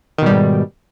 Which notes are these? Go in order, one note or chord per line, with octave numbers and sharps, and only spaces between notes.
G#2 B2 D#3 G3